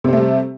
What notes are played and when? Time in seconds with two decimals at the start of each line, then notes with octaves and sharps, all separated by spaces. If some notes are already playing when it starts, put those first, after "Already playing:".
0.04 C3
0.09 C4
0.13 A3
0.17 G3